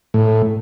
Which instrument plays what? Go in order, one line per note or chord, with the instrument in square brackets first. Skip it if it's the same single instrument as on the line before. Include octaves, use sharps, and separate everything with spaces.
[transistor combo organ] A2